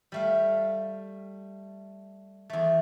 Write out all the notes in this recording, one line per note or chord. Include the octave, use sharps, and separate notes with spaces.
G3 A3 F5
E2 A3